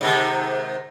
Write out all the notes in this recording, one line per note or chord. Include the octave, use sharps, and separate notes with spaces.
G#2 C3 D#3